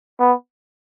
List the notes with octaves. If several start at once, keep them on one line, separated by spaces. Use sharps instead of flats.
B3